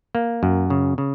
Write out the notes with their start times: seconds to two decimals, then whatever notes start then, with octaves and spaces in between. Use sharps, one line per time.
0.15 A#3
0.43 F#2
0.70 C#3
0.98 C#3